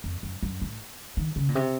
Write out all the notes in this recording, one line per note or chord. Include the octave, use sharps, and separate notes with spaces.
F2
F#2
F#2
A2
D#3
C#3
A#2
C3